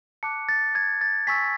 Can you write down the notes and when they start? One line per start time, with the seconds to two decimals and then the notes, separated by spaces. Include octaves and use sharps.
0.23 A5 D6 F#6 C#7
0.49 A6
0.75 G#6
1.01 A6
1.27 G#5 C#6 E6 B6